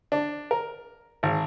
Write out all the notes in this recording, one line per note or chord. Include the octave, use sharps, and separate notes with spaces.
D4
A#4
G#1